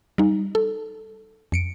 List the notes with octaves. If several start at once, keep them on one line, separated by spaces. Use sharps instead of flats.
G3 D#4
A4
F2 C#7 D7